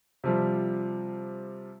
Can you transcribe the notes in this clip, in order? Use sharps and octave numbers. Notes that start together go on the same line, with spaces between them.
C3 F3 G3